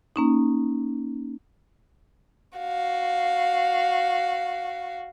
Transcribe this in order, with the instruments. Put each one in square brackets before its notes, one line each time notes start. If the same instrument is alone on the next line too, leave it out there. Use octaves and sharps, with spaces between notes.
[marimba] A#3 C#4 D#4
[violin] F#4 F5